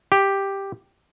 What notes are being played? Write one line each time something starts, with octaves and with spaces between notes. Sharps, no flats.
G4